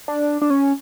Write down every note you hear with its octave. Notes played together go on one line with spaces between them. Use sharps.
D4
D4
C#4